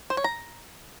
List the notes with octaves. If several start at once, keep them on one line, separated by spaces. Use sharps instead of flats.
C5
C#5
A#5